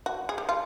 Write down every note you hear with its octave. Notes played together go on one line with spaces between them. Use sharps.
F#4
G#4
G4
F4